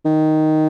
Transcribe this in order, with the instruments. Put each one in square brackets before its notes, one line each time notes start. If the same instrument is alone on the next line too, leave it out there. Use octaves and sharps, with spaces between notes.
[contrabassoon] D#3